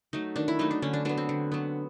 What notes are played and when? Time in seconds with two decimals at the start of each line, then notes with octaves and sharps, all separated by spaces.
0.13 F#3 A3 D#4
0.36 D#3 D4
0.48 E4
0.59 F#3 A3 D#4
0.71 D4
0.82 D3 C#4
0.93 D4
1.05 F#3 B3 D4
1.18 C4
1.29 D3
1.52 F#3 B3